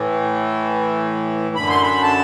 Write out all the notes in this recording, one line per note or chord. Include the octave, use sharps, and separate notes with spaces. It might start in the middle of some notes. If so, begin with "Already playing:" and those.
Already playing: A2 E3
F#2 D3 B5
C6
B5
A5